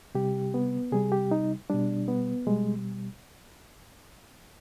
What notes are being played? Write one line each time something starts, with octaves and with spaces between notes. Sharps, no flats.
C3 G3 G4
B3
C3 G3 G#4
G4
D#4
B2 G3 D4
B3
B2 G3 G#3